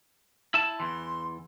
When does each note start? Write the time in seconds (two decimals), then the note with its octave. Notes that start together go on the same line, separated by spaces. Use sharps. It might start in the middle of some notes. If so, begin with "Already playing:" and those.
0.54 E4 A5
0.80 E2 E3 C6